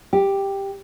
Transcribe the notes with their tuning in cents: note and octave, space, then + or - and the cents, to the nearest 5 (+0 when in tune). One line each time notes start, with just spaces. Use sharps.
G4 +5